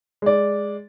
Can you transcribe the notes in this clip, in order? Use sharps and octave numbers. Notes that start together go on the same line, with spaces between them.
G#3 D5